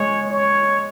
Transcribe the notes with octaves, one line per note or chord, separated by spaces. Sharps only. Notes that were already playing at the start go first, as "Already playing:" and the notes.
Already playing: G#3 C#5
C#5